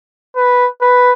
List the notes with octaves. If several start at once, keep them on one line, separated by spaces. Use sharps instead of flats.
B4
B4